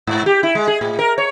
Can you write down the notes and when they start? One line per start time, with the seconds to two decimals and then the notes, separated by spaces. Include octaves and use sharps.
0.07 G#2
0.26 G4
0.43 E4
0.55 G#3
0.67 G#4
0.81 A2
0.99 A#4
1.18 C#5